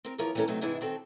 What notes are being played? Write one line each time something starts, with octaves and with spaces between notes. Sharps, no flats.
C4 A#4
E3 F3 B3 F4 A#4 C#5
E3 G3 B3 C#4 A4 A#4
C3 D#3 F#3 A3 B3
G#2 C3 E3 G#3 D4 E4
D#3 C4 F#4 A4